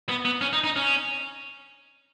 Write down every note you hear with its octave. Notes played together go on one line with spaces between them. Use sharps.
B3
B3
C#4
D#4
D#4
C#4